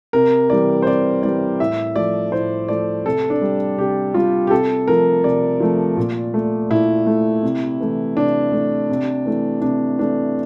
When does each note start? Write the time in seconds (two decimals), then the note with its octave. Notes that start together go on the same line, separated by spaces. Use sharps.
0.13 C3 A#4
0.50 E3 G3 D5
0.82 C5
0.87 C3 D5
1.23 E3 G3 D5
1.60 A2 E5
1.96 F3 A3 D5
2.32 A2 C5
2.68 F3 A3 D5
3.06 C3 A4
3.30 D4
3.41 G3
3.78 C3 G4
4.14 G3 F4
4.47 G4
4.51 C3 A4
4.88 F3 A3 A#4
5.24 C3 D5
5.60 F3 A3
5.97 A#2
6.34 A3
6.70 A#2 E4
7.07 A3
7.43 C3
7.80 E3 A3
8.16 C3 D4
8.52 E3 A3
8.90 C3
9.25 E3 A3
9.61 C3 D4
9.98 E3 A3 D4